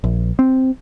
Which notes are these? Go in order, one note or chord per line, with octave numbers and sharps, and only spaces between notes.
A#1
C4